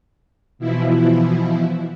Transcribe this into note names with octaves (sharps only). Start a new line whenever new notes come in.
B2 E3 F3 E4